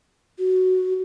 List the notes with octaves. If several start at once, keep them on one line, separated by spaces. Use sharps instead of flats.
F#4